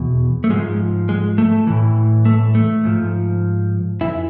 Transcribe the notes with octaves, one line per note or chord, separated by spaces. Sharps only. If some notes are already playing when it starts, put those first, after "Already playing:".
Already playing: E2 B2
A3
G#2 F3 G#3
G#3
A3
A2 E3
A3
A3
G#2 F3
F2 E3 E4